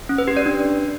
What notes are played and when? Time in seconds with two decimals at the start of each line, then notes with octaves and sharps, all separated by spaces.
0.09 C#4
0.18 B4
0.28 G4
0.37 D5
0.46 D4